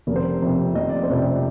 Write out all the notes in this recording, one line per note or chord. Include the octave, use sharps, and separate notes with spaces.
F1 A#4
C5
A#4
F2 C3
F1 D#5
D5
C5
F2 C3
D5